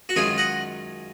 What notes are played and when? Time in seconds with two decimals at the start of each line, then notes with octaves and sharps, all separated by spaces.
0.09 F#4
0.16 F#2 D#3 G#3 C#4 F4 G#4
0.38 D#5 F#5